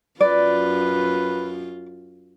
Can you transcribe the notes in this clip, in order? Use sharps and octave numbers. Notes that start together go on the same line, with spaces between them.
F#2 F4 B4 D5